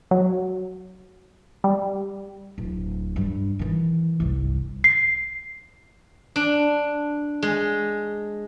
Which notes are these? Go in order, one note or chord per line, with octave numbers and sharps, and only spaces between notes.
F#3
G3
D1
G2 G3
D#3 E3
G1 C2
C7
D4
G#3